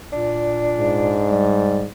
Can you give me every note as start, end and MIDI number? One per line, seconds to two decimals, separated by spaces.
0.12 1.21 46
0.12 1.58 62
0.77 1.90 44
1.31 1.88 55